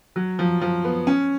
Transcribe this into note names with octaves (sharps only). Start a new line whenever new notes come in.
F#3
F3
F3
B3
C#4